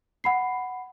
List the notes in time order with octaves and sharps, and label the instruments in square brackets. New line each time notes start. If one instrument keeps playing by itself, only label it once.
[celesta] F#5 B5 C7